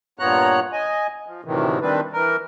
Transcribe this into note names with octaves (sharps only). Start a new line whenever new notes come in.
G2 A#2 B3 C#5 A#5 F#6
D#5 G#5
F3
D2 A2 C3 D#3 E3
D#3 G3 C4 D4 B4
E3 A#4